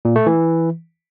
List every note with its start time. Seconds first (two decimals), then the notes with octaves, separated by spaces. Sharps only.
0.05 A#2
0.16 A3
0.26 E3